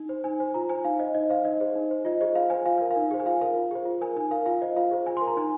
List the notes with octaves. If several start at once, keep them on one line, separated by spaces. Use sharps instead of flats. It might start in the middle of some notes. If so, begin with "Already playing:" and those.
Already playing: D#4
C5
D#4 G#5
C5
F4 A#5
C5 G#5
D#4 F5
C5 D#5
D#4 D#5
C5 F5
D#4 D#5
G#4 C5
D#4
C5
F4 D#5
G#4 C5 D#5
F4 F5
C5 G#5
F4 F5
A#4 G#5
F5
D#4
G#4 C5
G#5
F4 F5
A#4 F5
F4
G#4 C5
F4
A#4 G#5
D#4 G#5
A#4 F5
F4 F5
C5 D#5
F4 F5
G#4 C5
F4 G#5
C6
A#4
A#5
D#4 G#5